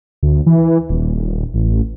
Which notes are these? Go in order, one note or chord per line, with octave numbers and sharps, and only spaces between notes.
D2
E3
D#1
A1